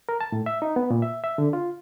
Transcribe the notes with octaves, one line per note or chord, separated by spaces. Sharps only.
A#4
A5
A2
E5
D#4
B3
A#2
E5
E5
D3
F4